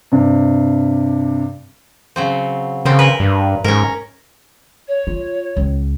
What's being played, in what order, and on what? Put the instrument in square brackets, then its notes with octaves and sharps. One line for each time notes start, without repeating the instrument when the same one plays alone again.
[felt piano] G2 C3
[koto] C#3 F#3 C4
[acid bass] C#3 [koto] A#3 C4
[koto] A#4 B4
[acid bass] G2
[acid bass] G#2 [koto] C#4 A#4
[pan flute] C#5
[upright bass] F4
C#2